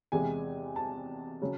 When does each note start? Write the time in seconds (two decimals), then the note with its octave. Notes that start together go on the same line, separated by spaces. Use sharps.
0.12 E2 C3 E3 G#3 G#5
0.76 A5
1.42 C#3 F#3